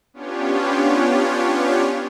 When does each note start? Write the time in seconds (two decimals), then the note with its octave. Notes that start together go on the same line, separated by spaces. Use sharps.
0.13 B3 C#4 D4 F4 G4 C#5